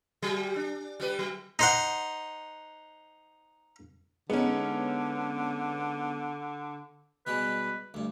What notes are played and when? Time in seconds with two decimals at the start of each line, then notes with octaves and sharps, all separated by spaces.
0.22 F#3 G3 G#4
0.56 D4
1.00 G3 G4 B4
1.19 F#3
1.59 D#4 C5 F#5
4.30 D3 G#3 B3 C#4 D#4
7.27 B2 G3 G#3 B4
7.94 D2 G2